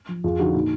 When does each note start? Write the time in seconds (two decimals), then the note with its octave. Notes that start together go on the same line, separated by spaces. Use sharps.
0.09 F3
0.24 F2 F4 G#4
0.39 D3 F3 D#4 F#4
0.54 A#2 D#4